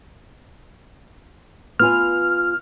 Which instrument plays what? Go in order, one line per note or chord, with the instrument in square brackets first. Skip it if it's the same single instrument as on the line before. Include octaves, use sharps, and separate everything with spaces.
[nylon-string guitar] B3 F4 G#5 [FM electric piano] F6